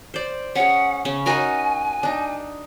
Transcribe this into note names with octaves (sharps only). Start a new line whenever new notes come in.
C5 D5
C#4 G#4 F#5
C#3 C#4
D#4 F#4 A#4 G#5
D4 D#4